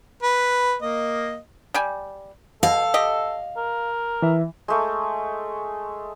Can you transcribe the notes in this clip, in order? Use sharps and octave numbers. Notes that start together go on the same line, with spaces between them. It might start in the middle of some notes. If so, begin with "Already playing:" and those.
B4
A#3 D#5
G3 G5 G#5
B2 A4 F5
G4 D#5
A#4
E3 E5
G#3 A3